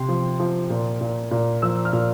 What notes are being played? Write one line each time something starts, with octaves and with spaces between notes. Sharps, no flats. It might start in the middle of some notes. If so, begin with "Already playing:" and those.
Already playing: C3 C6
F3
F3
A#2
A#2
A#2
F3 E6
F6
A#2